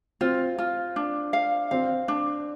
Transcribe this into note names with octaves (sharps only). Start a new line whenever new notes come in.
C4 F4
F4
D4
F5
C4 F5
D4